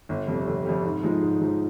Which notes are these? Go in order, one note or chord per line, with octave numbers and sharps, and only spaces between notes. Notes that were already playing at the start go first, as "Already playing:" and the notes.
G1
F2 C3 G3
G1
F2 C3 G3
G#2
F3 G#3 D#4
G#2
F3 G#3 D#4